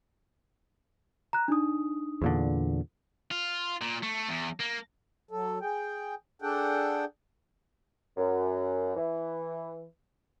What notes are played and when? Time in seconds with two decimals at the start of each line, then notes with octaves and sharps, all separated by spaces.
1.33 A#5 F#6
1.48 D4 D#4 D#6
2.22 E2 A#2 D3
3.31 F4
3.81 A#2
4.03 A3
4.29 E2
4.60 A#3
5.31 F#3 A4
5.62 G#4 G5
6.42 D4 G#4 A4 F#5 G5
8.16 F#2
8.95 E3